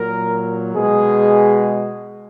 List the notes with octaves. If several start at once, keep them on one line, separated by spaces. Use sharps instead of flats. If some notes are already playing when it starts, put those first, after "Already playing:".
Already playing: A#2 F#3 A#4
B2 G#3 G#4